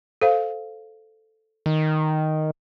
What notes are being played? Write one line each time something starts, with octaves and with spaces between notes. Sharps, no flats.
A4 C5 F5
D#3